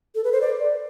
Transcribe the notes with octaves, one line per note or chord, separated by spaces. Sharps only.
A4
B4
C5
D5